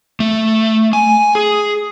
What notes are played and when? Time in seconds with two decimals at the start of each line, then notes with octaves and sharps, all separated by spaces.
0.20 A3
0.93 G#5
1.35 G#4